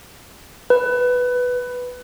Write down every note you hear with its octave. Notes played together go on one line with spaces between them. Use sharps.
B4